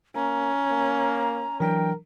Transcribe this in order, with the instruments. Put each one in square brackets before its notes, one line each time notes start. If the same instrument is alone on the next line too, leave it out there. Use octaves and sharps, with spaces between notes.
[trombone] A#3 [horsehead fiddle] C#4 [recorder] A#5
[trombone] A#3
[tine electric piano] E3 F#3 D4 [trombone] A#4 [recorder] G5